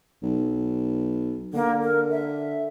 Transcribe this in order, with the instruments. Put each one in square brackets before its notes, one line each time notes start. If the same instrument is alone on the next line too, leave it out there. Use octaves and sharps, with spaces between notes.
[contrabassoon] B1
[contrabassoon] D3 [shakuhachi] A#3
[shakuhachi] A#4
E5